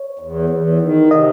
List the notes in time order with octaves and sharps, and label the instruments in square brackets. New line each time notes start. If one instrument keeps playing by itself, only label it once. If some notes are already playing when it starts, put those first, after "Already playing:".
Already playing: [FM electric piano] C#5
[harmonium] E2
E2
D#3
[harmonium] C3 [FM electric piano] D#5